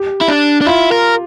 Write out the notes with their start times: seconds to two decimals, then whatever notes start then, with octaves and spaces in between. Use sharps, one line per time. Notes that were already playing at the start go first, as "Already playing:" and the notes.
Already playing: G4
0.21 E4
0.29 D4
0.61 D4
0.66 E4 F4
0.92 A#4